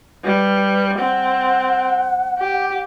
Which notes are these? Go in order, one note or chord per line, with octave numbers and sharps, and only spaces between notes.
G3 B4
C4 F#5
G4